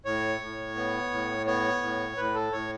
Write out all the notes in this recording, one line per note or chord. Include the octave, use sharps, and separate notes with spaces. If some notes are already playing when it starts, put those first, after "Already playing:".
A2 C#5
A2
B3
A2
B3 C#5
A2
A2 B4
A4
A2 C#5